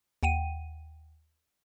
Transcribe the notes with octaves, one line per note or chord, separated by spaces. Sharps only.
D#2 F#5 G5 D#7